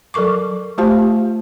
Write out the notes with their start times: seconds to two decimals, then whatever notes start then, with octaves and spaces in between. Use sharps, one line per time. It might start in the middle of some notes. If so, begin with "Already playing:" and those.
0.14 F#3 A4 A#4 C#6 D6
0.78 A3 F4 G4 C5 F5 A5